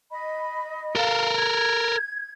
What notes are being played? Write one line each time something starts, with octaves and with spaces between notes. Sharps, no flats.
D#5 B5
A4 A#4 F5
G#6